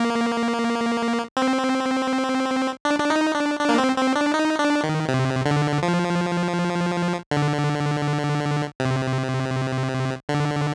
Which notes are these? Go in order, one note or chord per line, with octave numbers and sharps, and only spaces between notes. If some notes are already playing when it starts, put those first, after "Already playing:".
Already playing: A#3
C4
D4
D4
D#4
D4
D4
A#3
C4
C4
D4
D#4
D4
D#3
C3
D3
F3
D3
C3
D3